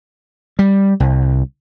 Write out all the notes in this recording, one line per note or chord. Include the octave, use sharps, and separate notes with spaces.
G3
C2